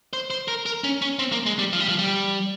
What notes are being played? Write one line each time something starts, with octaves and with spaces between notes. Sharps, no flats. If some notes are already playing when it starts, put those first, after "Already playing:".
C5
C5
A#4
A#4
C#4
C#4
C4
A#3
G#3
G3
F3
G3
F3
G3